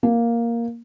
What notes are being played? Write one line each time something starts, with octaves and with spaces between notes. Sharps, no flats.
A#3